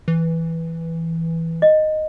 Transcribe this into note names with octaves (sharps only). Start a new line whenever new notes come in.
E3
D#5